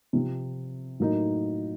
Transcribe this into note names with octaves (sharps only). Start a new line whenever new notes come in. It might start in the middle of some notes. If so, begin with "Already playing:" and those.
C3 F3 C4
A2 F#3 A#3 D#4